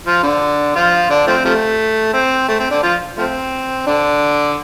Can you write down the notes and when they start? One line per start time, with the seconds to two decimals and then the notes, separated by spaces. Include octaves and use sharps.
0.06 F3 F4
0.23 D3 D4
0.76 F3 F4
1.09 D3 D4
1.27 F3 A3 C4
1.44 C3 F3 A3
2.14 C4
2.48 A3
2.59 C4
2.71 D3 D4
2.83 F3 F4
3.17 F3 A3 C4
3.86 D3 D4